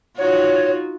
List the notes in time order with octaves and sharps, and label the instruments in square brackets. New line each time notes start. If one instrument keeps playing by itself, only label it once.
[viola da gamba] D#4 F4 F#4 [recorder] C#5